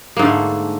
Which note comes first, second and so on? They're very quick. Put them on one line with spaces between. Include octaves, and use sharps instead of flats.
A#3 G#2 D3 A3